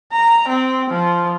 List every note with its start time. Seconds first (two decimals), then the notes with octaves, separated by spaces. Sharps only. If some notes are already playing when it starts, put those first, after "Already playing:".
0.13 A#5
0.49 C4
0.91 F3